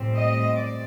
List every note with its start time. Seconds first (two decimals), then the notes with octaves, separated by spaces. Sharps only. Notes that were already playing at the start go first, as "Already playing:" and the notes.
Already playing: A2 G3 C4
0.16 D#5
0.56 D5